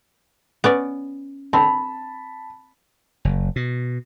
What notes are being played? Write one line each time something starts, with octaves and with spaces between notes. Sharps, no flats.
B3 C#4 D5
C4 A5 B5
F#1
B2